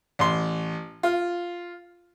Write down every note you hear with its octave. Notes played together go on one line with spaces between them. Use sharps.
A1 C6
F4